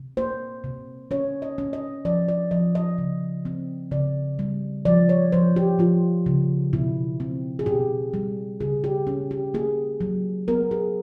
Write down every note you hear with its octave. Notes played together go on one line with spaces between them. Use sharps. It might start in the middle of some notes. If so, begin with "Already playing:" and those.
Already playing: C3
A#3 C5
C3
C#4 C#5
D#5
C#4
D#5
F3 D5
D5
F3 D#5
D#5
C#3
C4
C#3 D5
G3
F3 D5
C#5
F3 C5
G4
F3 F4
C#3
B2 E4
C4
G#4
B2 G4
G3
C#3 G#4
G4
C#4
G4
A#3 G#4
F#3
B3 A#4
G#4